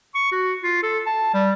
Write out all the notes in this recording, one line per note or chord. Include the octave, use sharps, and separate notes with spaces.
C#6
F#4
F4
A4
A5
G3